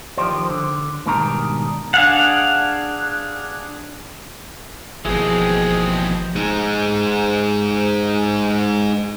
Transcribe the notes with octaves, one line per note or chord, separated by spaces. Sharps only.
D#3 F3 G4 C5
D3
G#2 B2 D#3 G3 D4 A#5
D4 G#4 F5 F#5
G#1 D#2 B2 E3 F3 G#3 C4 G#4
G#3 D#4